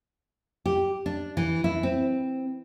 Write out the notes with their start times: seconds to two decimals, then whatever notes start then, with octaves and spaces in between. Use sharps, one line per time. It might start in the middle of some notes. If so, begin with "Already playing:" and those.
0.66 G4
1.06 D4
1.37 E3
1.64 E4
1.83 C4